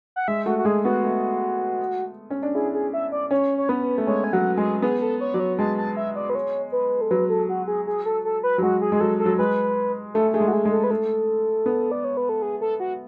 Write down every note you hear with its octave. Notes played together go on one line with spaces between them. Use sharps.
F#5
G#3 E5
A3 F#4
F#4
G#3 G#4
B3 F#4
A3
C#4
D4
E4 G#4
G#4
E5
D5
C#4 C#5
C#5
B3 B4
A3
G#3 C#5
G#5
F#3 F#5
G#3 G#4
B3 G#4
A4
C#5
F#3 D5
C#5
G#3 A5
A5
E5
D5
B4
C#5
B4
A4
F#3 B4
A4
F#4
G#4
G#4
A4
A4
B4
F#3
G#3 F#4
G#4
G#3 G#4
F#3 A4
A4
F#3
G#3 B4
A3 A4
A3 G#4
G#3
F#4
G#4
G#3
A4
B4
A3 A4
B3
D5
C#5
B4
A4
G#4
A4
F#4